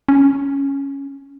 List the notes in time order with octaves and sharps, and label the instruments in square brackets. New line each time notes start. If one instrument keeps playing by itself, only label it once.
[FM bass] C#4